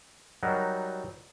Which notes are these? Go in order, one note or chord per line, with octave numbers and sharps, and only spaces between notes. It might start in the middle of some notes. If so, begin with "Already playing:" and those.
F#3 G3 D#4 F#4 A#4